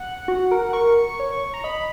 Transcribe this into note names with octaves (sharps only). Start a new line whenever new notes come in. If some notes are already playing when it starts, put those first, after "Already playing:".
Already playing: F#5
F#4
A#4
A#4 C#6
C#5
A#5
D#5 B5